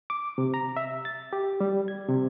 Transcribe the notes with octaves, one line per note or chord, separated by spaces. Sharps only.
D6
C3
A#5
E5
A6
G4
G3
G#6
C3